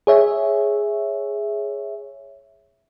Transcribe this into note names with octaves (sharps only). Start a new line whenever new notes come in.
G#4 C#5 E5